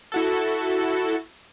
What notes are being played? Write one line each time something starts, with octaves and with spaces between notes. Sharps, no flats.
E4 F#4 A4